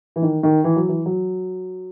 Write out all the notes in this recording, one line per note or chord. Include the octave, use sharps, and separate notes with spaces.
E3
D#3
D#3
E3
F#3
E3
F#3